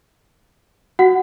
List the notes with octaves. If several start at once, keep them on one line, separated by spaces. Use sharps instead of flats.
F#4 F#5